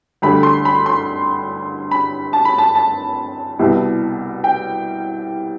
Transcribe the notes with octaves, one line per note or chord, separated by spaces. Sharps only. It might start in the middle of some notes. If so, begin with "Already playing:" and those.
D2 D3 G3 B5
C6
B5
C6
B5
A5
B5
A5
A5
C2 B2 G3 B3 E4
G5